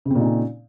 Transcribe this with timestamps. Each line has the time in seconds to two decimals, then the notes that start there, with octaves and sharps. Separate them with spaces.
0.05 C#3
0.10 C4
0.15 A#2
0.20 D#4
0.25 C#4